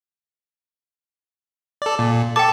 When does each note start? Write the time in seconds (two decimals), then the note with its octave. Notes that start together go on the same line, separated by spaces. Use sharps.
1.82 A4 D5
1.99 A#2
2.36 A4 G5 A5 D6